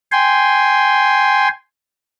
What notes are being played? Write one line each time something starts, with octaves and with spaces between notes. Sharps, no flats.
G5 G#5 C6